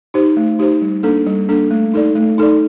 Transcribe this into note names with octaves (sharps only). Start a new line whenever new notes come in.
D#4 G4 C5
A3
D#4 G4 C5
G3
A#3 D4 A4
G3
A#3 D4 A4
A3
D#4 A4 D5
A3
D#4 A4 D5